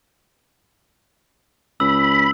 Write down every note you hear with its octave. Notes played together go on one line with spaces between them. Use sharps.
C#2 B5 E6